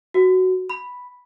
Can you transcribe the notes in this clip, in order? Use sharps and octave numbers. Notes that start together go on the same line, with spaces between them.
F#4
B5